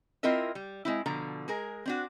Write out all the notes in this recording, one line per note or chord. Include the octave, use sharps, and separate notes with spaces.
C4 E4 F4 A#4 D#5 E5
G3
G#3 C4 E4
B2 D3 F3 A#5
G#3 G#4 A#4
C4 D4 F#4